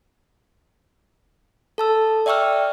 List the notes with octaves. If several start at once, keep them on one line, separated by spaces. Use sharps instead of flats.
A4 A5 E6
D5 E5 G5 C#6 E6 F6